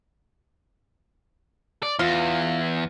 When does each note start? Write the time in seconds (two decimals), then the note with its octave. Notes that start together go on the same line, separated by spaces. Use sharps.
1.83 D5
1.99 E2 F4